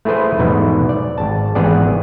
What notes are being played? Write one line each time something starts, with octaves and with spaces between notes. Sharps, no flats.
A3 E4 G#4 B4 C5
E2 G#2 B2 E3
D5
G#1 A5
G#1 E3 B3 G#4 D5